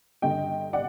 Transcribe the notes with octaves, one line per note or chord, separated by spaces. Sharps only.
G2 D3 D#5 G5
D5 F#5